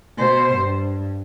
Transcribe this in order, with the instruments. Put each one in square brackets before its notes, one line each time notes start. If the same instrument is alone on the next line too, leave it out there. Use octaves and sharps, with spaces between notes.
[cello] B2 C5
G2